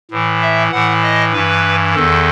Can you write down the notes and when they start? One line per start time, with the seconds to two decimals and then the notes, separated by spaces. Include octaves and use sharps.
0.11 A2 E3
0.42 E5
0.72 A2 E3 F#5
1.03 D#5
1.33 G2 E3 B4
1.95 E2 D#3 A4